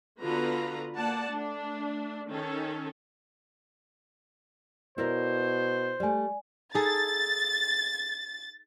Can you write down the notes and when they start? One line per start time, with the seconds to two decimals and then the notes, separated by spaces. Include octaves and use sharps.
0.21 D3 B3 F4 F#4 B4 A#5
0.97 A#3 D5 F#5 A5
1.31 A3 D4
2.28 D#3 C#4 A4
4.98 B2 E4 A#4 C5 D5
6.00 G3 A3 D5 G#5
6.74 D#4 G#4 A4 A6